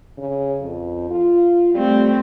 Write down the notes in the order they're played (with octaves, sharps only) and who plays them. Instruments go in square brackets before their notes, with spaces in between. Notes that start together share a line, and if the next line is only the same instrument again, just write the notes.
[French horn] C#3
F2
F4
[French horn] G3 [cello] A3 C4